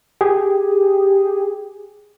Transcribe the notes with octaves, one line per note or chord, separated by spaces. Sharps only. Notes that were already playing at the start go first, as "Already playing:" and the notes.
G4 G#4